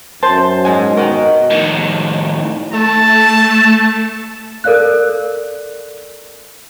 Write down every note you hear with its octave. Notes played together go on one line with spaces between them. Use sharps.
F#2 C5 A5
G#2 D#5 G#5
B2 F#4 A#4 D#5
A2 D#3
A3 A5
A4 A#4 D5 F5 F#6